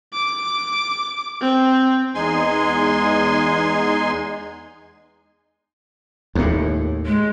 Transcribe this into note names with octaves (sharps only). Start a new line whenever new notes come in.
D6
C4
E2 G#3 D#4 G#5 C6
D#2 A2
G#3